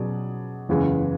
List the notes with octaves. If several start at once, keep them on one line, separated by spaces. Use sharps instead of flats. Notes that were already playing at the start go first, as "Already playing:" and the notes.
Already playing: B2 F#3 C#4 G#4 D5
F#1 E2 C#3 E3 G#3